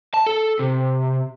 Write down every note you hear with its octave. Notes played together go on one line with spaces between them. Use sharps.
A5
A4
C3